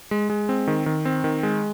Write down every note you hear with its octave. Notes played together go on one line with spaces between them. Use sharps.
G#3
G#3
C4
D#3
D#3
C4
D#3
G#3